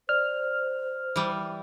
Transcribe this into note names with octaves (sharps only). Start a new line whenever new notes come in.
C5 D5 F6
E3 G3